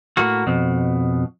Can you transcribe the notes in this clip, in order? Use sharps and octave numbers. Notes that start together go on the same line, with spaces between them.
A2 A#3 F#4
F2 B2